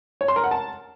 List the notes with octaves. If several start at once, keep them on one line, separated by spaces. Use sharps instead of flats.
C#5
C6
A#4
F#5
A5